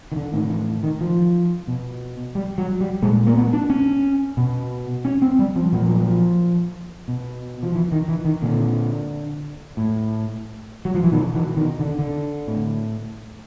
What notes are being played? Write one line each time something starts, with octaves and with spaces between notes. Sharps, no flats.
D#3
D3
A2 D#3
E3
D#3
F3
B2
G3
F#3
G3
A#2 G#3
A#3
B3
D4
C#4
B2
C#4
C4
G3
F3
A#2 F3
F#3
F3
B2
F3
E3
D#3
E3
D#3
A#2 D3
A2
F#3
F3
E3
B2 D#3
E3
D#3
D3
D3
A2